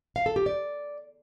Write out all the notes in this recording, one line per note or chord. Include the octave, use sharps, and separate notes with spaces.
F5
A4
G4
D5